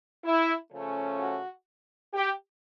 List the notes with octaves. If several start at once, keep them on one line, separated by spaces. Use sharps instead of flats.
E4
C#3 F3 A3 C#4
F#4
G4